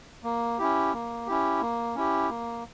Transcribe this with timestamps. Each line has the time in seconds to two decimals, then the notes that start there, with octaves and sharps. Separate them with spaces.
0.24 A#3
0.59 C#4 E4 G4
0.94 A#3
1.27 C#4 E4 G4
1.61 A#3
1.95 C#4 E4 G4
2.30 A#3